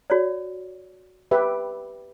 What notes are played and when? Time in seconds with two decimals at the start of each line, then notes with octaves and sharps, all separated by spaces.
0.10 F#4 C#5 D5
1.31 G4 B4 E5